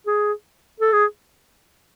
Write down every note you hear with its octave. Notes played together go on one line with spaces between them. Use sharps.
G#4
A4
G#4